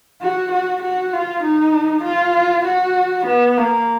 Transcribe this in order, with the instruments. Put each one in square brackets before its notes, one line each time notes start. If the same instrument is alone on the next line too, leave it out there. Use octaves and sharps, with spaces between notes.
[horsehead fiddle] F#4
F#4
F#4
F4
D#4
F4
F#4
B3
A#3